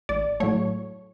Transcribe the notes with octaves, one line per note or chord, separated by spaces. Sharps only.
A1 D5
A2 F#3 A3 C#5